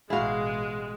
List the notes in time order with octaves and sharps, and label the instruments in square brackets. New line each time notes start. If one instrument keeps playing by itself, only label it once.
[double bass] A1 B2 [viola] G#3 [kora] E4 F#4 [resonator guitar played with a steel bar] G#4 F5